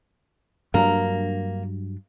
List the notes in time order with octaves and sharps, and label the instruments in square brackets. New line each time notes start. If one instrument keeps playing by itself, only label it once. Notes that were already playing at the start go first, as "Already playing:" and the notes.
[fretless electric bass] G2 F#3 D4 [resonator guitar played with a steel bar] A#3